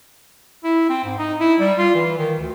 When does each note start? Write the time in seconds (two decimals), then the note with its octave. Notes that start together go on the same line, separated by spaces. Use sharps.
0.64 E4
0.89 C4
1.04 G#2
1.18 D#4
1.40 E4
1.59 G3
1.78 F4
1.95 E3
2.18 D#3
2.39 D2